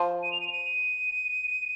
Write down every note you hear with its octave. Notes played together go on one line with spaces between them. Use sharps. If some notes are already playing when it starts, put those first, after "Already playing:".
Already playing: F3
D#7
F7
D#7
F7
D#7